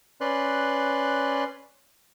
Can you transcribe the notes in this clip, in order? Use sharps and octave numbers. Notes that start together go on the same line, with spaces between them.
C#4 B4 D5 C6 F#6